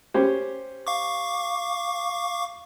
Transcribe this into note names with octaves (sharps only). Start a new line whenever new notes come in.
C#4 G4 C5
F5 C#6 D6